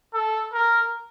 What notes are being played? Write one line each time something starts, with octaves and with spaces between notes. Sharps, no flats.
A4
A#4